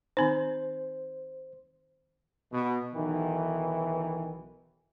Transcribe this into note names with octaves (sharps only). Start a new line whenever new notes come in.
D#3 C4 D#4 C5
B2
B1 D#3 E3